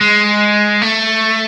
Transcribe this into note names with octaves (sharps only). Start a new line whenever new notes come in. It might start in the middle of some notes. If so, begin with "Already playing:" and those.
G#3
A3